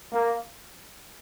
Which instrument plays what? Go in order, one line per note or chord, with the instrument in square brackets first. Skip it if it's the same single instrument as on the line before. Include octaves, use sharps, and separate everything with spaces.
[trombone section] A#3